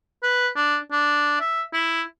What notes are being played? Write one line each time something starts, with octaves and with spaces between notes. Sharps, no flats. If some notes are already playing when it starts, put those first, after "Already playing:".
B4
D4
D4
E5
E4